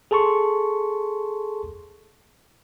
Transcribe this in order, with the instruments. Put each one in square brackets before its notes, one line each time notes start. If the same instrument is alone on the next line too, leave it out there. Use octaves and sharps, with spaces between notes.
[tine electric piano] G#4 A4 A5 C6 C#6